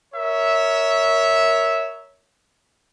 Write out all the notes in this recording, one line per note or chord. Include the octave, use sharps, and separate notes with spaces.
A#4 C#5 E5